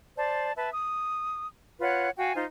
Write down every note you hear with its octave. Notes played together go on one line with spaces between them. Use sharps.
C5 D5 A5
B4 E5 A5
D#6
F4 B4 C#5 F#5
F#4 F5 G5 G#5
D#4 F4 C5